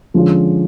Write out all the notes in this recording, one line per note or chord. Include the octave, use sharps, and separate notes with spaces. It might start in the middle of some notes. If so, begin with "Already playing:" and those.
D3 F3 G#3 C#4 F4